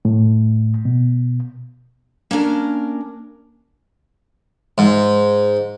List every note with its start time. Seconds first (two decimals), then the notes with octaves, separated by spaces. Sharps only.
0.05 A2
0.85 B2
2.31 A#3 C#4 D4 A#4
4.78 G#2